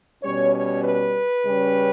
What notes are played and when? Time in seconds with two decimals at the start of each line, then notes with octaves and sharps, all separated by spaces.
0.23 B2 G3 C#4 C#5
0.53 C#5
0.84 B4
1.45 C#3 G3 C#4